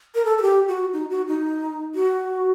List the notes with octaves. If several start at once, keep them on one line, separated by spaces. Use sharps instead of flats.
A#4
A4
A4
G4
F#4
D#4
F#4
D#4
F#4